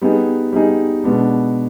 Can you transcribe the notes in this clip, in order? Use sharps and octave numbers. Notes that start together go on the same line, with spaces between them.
G3 B3 D#4 G#4
G3 B3 D#4 G#4
B2 G#3 B3 D4